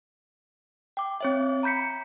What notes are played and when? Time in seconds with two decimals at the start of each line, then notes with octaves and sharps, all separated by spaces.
0.97 G5 D6
1.21 C4 C#5 E5
1.63 A#5 B5 G6 B6 C#7